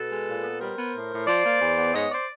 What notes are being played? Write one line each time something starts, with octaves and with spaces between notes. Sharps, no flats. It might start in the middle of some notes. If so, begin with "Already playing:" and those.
Already playing: B2 A4 B4
G#3
A#2
B3
G3 A#4 C5
B3
A2
A2
F3 C5 D5
A#3
E2
B3
G#2 C#5 D#5
C5 D5